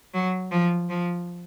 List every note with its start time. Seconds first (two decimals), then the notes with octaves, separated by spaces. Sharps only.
0.14 F#3
0.51 F3
0.89 F3